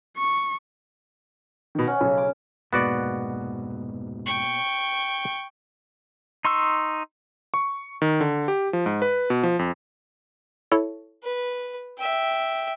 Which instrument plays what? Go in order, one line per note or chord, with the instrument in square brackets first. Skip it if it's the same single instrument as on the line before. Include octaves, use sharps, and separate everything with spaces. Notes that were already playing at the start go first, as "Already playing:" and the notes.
[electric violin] C#6
[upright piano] B2 D#3
[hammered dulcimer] C#4 [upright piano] F#5
[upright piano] B1 C#3
[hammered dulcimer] D6
[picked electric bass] F1 G#2 G#3 [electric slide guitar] B2 A#3 [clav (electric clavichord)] B3 F#4 D5
[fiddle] G5 C#6
[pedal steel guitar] D#4 C6 C#6 E6
[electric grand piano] C#6
D#3
D3
G4
F3
G#2
B4
B2
F3
F2
[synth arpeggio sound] E4 A4 C#5
[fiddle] B4
E5 G5